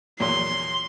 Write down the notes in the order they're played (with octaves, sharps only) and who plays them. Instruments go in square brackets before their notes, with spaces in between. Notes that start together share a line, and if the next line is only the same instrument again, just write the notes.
[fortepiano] E2 A#2 F#3 [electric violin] C6